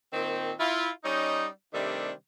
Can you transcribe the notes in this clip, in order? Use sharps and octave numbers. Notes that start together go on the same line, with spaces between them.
A#2 D#3 C4
E4 F4
G3 C#4 D#4
C3 D#3 G3 A3 D4